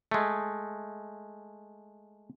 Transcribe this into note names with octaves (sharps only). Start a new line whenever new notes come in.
G#3 A3